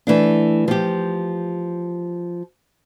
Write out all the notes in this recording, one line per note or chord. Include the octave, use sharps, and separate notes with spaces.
E3 A3 D4
F3 G4